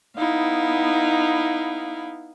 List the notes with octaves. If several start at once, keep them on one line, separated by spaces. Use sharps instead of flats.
B3 D#4 E4 F5